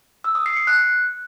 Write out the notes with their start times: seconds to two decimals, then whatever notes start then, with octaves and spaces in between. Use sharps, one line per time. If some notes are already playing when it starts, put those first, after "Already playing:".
0.24 E6
0.35 D#6
0.46 C7
0.57 C#7
0.67 F#6